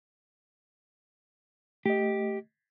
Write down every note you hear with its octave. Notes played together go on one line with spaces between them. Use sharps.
A3 G4 D#5